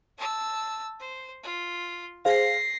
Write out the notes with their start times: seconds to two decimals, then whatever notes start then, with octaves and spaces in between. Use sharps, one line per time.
0.18 A5 E6
0.99 C5
1.43 F4
2.25 G#4 C5 F5 A#6 C7